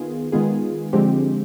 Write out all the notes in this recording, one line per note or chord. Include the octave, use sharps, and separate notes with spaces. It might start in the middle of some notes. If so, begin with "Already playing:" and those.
Already playing: D#3 B3 F4 G#4
D#3 G#3 B3 F4 G#4
D3 F3 G#3 C4 G4